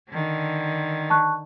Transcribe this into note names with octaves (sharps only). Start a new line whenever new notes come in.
D3 D#3
A5 C#6 F#6